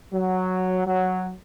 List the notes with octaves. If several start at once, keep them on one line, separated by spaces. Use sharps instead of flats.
F#3
F#3